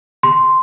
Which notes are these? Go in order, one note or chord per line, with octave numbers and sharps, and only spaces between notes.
C6